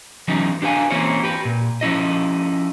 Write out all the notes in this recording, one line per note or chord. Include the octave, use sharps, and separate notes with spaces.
E3 F#3 B3 C#4 D#4
D4 G4 B4 F5 G#5
E3 A#3 C4 C#4 E4 C#5
G4 B4
A#2
F3 C#4 E4 D#5